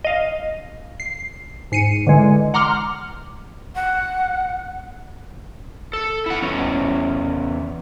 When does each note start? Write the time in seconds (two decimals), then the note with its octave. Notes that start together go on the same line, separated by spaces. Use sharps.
0.05 D#5 F5
1.00 C7
1.72 G#2 C7 C#7 D#7
2.07 D3 E3 G#3
2.54 F#5 A#5 C6 D6 F6
3.75 F#5
5.93 A4
6.26 E4 F#5
6.42 E2 C#4